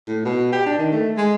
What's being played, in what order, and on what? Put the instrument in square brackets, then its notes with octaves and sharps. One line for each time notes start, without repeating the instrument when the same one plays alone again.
[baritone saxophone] A2
B2
G4
D4
D#3
A3
G#3